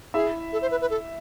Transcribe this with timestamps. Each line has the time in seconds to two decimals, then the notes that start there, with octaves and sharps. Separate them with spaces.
0.14 E4 G#4 E5
0.53 A4
0.62 C5
0.71 B4
0.81 B4
0.90 A4